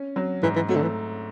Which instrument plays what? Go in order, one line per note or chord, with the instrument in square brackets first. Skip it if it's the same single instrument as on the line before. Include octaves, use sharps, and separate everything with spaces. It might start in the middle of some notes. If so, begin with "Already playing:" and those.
Already playing: [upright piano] C#4
F#3
[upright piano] G#2 [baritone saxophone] E3
[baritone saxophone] E3
[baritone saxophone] F#3 [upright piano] A3
[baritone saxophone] D3
E3